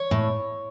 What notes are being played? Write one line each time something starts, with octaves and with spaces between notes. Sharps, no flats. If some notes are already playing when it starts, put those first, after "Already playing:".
Already playing: C#5
A2